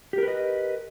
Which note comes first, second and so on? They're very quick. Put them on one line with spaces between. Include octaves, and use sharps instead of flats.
G4 A#4 B4 D#5